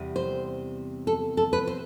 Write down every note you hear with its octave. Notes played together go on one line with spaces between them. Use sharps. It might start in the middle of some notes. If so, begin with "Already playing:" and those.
Already playing: E2 C3 G3
C5
A4
A4
B4
C5